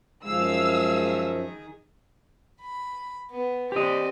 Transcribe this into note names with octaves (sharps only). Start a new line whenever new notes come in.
F#2 D#3 F3 G#3 G#4 F5 E6
B5
B3
C4 G4 D5 D#5